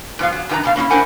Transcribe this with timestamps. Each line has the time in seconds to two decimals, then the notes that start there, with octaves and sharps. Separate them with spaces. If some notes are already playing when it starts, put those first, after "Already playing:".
0.19 G#2 F3 B3 F5
0.32 F#3
0.49 F#2 D#3 F4 B4 A#5
0.64 G#2 B2 F5
0.76 A#3 C#4 D#4 E4
0.90 D4 E4 A#4 C5 F#5 G#5